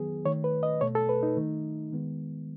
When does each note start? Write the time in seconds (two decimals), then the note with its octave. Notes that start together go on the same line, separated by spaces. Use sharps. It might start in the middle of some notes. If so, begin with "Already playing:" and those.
Already playing: D#3 F#3 B3 G#4
0.25 D#3 A3 C#5
0.44 B4
0.63 D#5
0.81 B2 A3 C#5
0.95 A4
1.09 B4
1.23 D#4
1.37 D#3 A3
1.92 D#3 G#3 B3